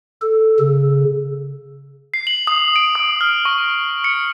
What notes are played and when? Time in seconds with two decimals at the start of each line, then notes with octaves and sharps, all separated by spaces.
0.22 A4
0.59 C#3
2.14 C7
2.27 F#7
2.47 D#6
2.76 D7
2.95 D#6
3.21 F6
3.45 C#6
4.04 C#7